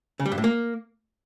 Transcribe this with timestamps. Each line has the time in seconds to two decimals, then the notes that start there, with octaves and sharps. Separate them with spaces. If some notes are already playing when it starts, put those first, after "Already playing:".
0.20 C#3
0.26 G3
0.32 G2
0.38 A2
0.44 A#3